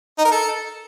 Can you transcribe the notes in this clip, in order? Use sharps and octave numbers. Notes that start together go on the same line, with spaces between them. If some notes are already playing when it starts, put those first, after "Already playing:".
D#4
A#4
A4